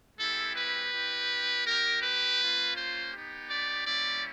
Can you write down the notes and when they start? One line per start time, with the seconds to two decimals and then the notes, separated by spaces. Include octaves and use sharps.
0.18 G#3 C4 E4 G4 A4
0.55 B4
0.92 C4 E4 G4
1.65 A#3 D#4 G4 A#4
2.02 B4
2.39 A#3 C#4 F4
2.75 C5
3.12 B3 D#4 G4
3.49 D5
3.85 G3 A#3 C#4 E4 D5